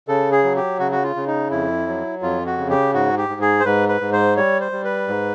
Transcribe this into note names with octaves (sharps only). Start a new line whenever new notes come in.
C#3 A4
G#4
F#3
G4
C#3 F#4
F#4
F4
C#3
D#4
F2 E4
F#3
F2 F4
F#4
C#3
G4
G#2 F#4
G4
G#2
G#4
C5
G#2 B4
B4
G#2
C5
G3 C#5
C5
G3
B4
G#2